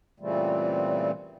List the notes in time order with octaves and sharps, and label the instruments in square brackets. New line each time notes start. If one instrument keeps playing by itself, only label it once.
[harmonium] A#2 C#3 E3 G3 A3 C4